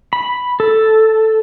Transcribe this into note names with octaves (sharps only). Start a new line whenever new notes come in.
B5
A4